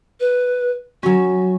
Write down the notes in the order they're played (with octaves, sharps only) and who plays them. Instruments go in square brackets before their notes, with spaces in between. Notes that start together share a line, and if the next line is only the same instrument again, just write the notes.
[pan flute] B4
[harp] F#3 C#4 [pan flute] F#4